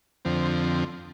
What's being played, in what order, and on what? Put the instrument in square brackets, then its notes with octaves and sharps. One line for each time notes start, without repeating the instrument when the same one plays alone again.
[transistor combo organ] F2 D3 F3 C4